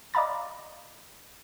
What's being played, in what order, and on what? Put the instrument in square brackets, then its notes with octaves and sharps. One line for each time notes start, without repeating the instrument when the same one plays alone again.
[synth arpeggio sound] D5 D#5 F5 A#5 B5 A6